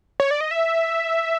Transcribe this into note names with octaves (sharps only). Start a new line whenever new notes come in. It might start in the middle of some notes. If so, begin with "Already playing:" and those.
C#5
D5
D#5
E5